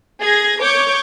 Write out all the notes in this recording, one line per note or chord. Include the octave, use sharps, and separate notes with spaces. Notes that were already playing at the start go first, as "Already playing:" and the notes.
G#4 G#6 A#6
C#5 C#6 D6 G6